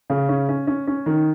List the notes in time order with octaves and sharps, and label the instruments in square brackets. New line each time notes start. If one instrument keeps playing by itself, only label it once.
[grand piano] C#3
C#4
C#4
C#4
C#4
D#3